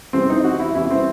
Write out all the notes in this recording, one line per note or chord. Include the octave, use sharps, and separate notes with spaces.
E2 C3 E3 C4
D#4
F#4
E4
E2 C3 E3 E4
C4